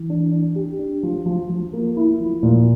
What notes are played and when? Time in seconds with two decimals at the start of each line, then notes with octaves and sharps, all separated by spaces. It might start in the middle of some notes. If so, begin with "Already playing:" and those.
Already playing: E3
0.10 D4
0.32 D4
0.55 G4
0.79 D4
1.03 F3
1.26 F3
1.50 F3
1.73 A#3
1.97 E4
2.20 F3
2.43 A#2